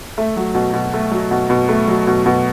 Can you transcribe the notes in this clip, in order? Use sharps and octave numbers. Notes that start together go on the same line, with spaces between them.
A3 E5
F#3
B2
B2
A3
F#3
B2
B2
A3
F#3
B2
B2